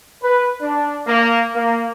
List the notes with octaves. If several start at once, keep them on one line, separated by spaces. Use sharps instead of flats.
B4
D4
A#3
A#3